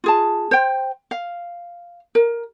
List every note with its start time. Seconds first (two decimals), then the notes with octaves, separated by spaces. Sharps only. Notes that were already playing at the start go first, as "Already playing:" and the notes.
0.04 F4 G#4 A5
0.51 C5 G5
1.11 F5
2.15 A#4